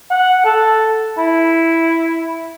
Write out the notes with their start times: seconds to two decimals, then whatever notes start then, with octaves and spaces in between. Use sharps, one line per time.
0.11 F#5
0.45 A4
1.18 E4